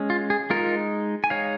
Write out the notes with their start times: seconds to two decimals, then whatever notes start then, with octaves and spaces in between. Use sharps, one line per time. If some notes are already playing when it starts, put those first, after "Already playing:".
Already playing: G#3 C#4
0.10 F4
0.30 G#4
0.50 G#3 D#4 F4 A#4
1.24 G#5
1.30 G#3 D#4 C#5 F5